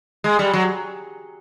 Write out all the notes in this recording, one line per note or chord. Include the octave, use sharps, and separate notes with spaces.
G#3
G3
F#3